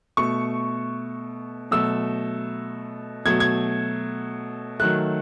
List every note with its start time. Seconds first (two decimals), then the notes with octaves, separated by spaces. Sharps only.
0.17 B2 A3 C#6
1.71 B2 F#3 A3 E6
3.25 B2 F#3 A3 G#6
3.40 G#6
4.80 D#3 F#3 A3 F#6